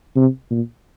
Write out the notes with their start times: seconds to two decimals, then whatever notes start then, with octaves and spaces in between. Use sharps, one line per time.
0.16 C3
0.50 A#2